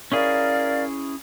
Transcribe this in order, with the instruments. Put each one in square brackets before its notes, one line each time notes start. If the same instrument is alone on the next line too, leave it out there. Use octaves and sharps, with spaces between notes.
[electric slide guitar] C#4 E4 G#4 [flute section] A#4 D5 F5